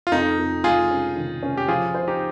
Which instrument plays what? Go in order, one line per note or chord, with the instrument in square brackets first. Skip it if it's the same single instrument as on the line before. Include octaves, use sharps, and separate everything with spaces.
[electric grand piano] F4
[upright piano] F2 [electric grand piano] D#4
[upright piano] F2
[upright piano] G#3 [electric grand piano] F4 G#4
[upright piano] C#4
D#3
C#4
[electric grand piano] G4
[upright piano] F3 [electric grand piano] F4 G#4
[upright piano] C5
[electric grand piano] D#4 G4